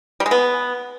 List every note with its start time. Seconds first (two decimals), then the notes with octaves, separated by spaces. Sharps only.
0.20 G3
0.26 G#3
0.31 B3